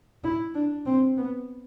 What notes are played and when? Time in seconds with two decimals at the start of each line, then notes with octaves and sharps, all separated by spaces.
0.24 E4
0.54 D4
0.86 C4
1.17 B3